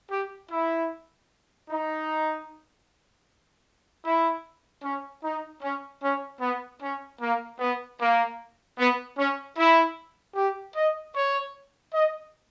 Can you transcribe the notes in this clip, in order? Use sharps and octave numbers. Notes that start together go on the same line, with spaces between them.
G4
E4
D#4
E4
C#4
D#4
C#4
C#4
B3
C#4
A#3
B3
A#3
B3
C#4
E4
G4
D#5
C#5
D#5